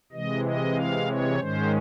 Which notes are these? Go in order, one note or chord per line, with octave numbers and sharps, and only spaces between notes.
C3 E3 G#3 D#5
D#5
F5
C#5
G#2 D#3 G#3 C#4 C5